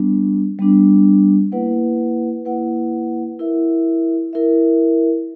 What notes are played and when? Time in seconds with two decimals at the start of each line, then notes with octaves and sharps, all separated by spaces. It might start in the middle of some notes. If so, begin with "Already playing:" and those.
Already playing: G3 B3 D4
0.59 G3 B3 D4
1.52 A#3 E4 B4 F#5
2.45 A#3 E4 B4 F#5
3.39 E4 A#4 E5
4.33 E4 A#4 E5